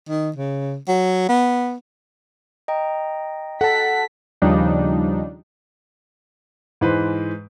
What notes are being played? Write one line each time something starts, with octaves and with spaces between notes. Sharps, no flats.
D#3
C#3
F#3
B3
D#5 G5 A#5
F#4 A4 F#5 A5 B6
D#2 C#3 F3 G3 D4 D#4
G#2 E3 B4 C5